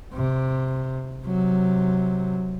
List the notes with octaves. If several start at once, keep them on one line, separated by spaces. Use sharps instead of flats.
C3
C3 F#3